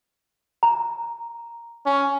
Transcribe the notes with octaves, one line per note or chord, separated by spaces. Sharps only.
A#5
C#4